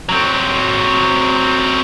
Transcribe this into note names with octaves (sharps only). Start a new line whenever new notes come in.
F#3 C4